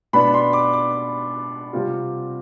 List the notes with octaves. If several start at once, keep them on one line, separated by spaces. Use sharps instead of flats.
B2 B3 D4 B5
C6
D6
D6
C3 G3 C4 F4